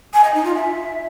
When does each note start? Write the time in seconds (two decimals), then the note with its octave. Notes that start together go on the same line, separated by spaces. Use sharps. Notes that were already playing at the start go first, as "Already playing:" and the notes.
0.13 G#5
0.24 D#5
0.34 D#4
0.44 F4
0.55 E5